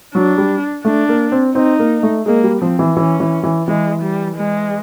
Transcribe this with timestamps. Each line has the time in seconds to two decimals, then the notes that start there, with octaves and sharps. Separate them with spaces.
0.14 F#3 D4
0.38 G3
0.85 A3 D4
1.09 A#3
1.32 C4
1.55 C4 D#4
1.79 A#3
2.03 A3
2.26 G#3 A#3
2.44 G3
2.62 F3 C4
2.79 E3
2.97 E3 C#4
3.20 E3
3.43 E3
3.67 E3 G#3
4.03 G3
4.37 G#3